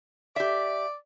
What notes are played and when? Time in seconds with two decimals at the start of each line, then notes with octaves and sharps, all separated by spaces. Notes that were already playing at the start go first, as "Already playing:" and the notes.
0.36 G4 D5 E5